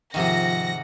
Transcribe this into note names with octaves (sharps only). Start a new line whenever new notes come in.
G#2 C3 D#3 F3 F#5 A#6